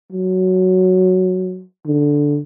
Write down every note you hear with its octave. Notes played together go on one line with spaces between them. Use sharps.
F#3
D3